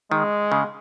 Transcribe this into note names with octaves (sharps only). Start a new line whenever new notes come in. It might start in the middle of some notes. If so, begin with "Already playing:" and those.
D#3 G#3
C#3